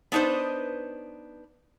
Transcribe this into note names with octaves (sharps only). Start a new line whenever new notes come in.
B3 D4 D#4 B4 C5